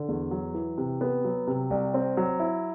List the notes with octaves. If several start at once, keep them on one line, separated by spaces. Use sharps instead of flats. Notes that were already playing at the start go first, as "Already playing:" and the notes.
Already playing: D3
E2
F#3
E3
C3
B3
F#3
C3
C2
C4
F#3
E4